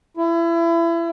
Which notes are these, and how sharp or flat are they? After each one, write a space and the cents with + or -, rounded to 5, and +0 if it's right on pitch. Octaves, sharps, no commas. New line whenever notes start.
E4 +30